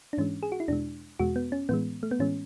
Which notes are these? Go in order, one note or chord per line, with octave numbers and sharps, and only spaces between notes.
D4
G#2 E3 G#3 C#4
G#4
F#4
E4
E2 B2 G#3 D4
E2 B2 G#3 F#4
B3
C#4
A2 E3 G#3 B3
A3
B3
A2 E3 G#3 C#4